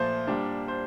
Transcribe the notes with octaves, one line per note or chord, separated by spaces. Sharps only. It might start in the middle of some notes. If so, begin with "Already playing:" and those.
Already playing: A#2 F3 A3 C5
A#2 G3 D4
C5